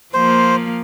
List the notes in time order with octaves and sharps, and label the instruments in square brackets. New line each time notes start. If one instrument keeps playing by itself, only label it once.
[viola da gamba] F3 A#3 [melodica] C5